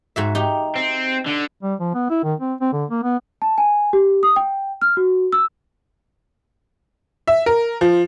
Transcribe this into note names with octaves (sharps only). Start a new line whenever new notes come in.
G#2 F#4 E5
D#4 G4
C4
D3
G3
F3
B3
E4
D#3
C4
C4
D3
A#3
B3
A5
G#5
G4
D#6
G5
F6
F#4
E6
E5
A#4
F3